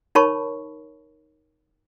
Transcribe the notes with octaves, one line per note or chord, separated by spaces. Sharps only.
D#4 A#4 C#5 A5 B5 C#6